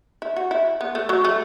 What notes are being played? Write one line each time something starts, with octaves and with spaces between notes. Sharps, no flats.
E4
F#4
E4
B3
A3
F#3
A3